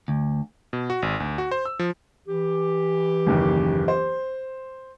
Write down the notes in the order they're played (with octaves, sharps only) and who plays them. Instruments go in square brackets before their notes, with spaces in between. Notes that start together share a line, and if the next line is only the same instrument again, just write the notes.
[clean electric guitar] D2
[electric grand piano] B2
F#4
G#1
D2
F#4
C5
E6
F3
[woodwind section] E3 G4
[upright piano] F#1 D#2
C5